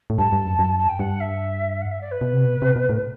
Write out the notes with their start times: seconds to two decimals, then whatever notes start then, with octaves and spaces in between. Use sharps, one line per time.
0.10 A2
0.18 G2 A5
0.32 G2
0.45 F#2
0.59 F#2
0.79 A5
0.89 G5
0.99 G2 F#5
1.20 E5
1.81 F#5
1.91 E5
2.01 D5
2.11 B4
2.21 B2
2.33 C3
2.45 B2
2.62 C3
2.76 B2
2.89 A2